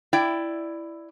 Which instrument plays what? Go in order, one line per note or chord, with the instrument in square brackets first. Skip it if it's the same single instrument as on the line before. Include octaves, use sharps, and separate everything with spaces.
[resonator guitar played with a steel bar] E4 D5 G5